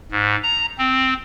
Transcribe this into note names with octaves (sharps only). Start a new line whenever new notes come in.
G#2
A#5
C4